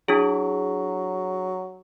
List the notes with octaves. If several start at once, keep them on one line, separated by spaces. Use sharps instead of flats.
F#3 D4 E4 G#4